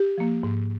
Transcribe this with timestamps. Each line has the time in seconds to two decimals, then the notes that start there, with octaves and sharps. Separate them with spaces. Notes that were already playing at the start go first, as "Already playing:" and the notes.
Already playing: G4
0.18 F3 A#3
0.43 G#2